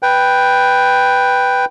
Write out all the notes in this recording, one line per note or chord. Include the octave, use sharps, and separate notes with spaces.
B4 G5